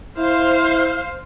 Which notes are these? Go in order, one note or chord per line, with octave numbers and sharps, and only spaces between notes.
E4 C5 F5